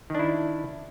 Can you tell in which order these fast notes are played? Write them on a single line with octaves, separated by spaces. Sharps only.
D#3 D4 E4